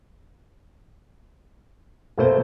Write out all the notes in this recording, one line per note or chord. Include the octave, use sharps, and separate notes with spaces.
B2 A3 A#3 A4 C5